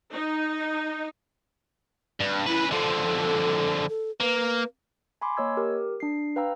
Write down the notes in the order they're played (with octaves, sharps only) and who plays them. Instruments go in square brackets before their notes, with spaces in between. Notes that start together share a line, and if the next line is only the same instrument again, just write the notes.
[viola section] D#4
[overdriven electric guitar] G2
[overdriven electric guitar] C#3 B4 [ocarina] E4
[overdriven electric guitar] D3 F3 [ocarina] A4
[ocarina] A4
[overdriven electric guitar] A#3 [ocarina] B4
[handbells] G#5 B5 C6 D6
A#3 C#5 D#5 E6 G#6
G4 A#4
D4 C7
B4 F5 G5 A#5 E6